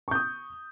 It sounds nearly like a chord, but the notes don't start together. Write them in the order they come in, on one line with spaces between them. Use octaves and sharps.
C#6 G6 D#6